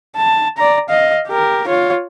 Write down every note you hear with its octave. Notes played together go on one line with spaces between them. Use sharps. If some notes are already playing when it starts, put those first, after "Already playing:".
A5
D5 A#5
D#5 F5
G4 A#4
F4 C#5